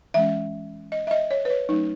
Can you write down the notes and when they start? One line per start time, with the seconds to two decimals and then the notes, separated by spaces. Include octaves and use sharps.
0.14 E3 G#3 C#4 E5
0.92 D#5
1.07 E5
1.11 D#5
1.31 C#5
1.45 B4
1.50 C#5
1.69 F#3 A3 C#4 D#4